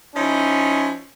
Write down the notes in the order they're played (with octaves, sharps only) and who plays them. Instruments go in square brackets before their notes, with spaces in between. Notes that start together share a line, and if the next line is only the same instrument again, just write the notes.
[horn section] F3 C#4 D#4 E4